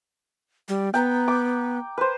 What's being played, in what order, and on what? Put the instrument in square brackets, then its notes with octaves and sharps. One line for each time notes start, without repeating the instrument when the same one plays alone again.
[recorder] G3
[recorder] B3 [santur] G5 A#5
[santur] D6
B4 C5